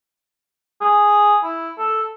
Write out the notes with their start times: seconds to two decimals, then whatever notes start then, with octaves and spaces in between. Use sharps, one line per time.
0.81 G#4
1.43 E4
1.78 A4